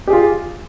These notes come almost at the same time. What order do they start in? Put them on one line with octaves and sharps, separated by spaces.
G4 G#4 F4